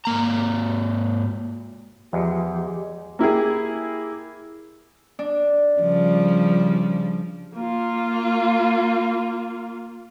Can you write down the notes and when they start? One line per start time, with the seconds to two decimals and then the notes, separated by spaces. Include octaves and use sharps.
0.05 G#2 A#3 A#5
2.13 E2 F3 G#3 G4
3.19 A#3 E4 G4 G#4
5.19 D4
5.81 C#3 F3 G3
7.55 A#3 F4